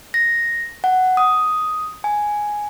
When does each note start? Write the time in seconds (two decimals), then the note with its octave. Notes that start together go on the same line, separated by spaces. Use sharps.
0.14 A#6
0.84 F#5
1.17 D#6
2.04 G#5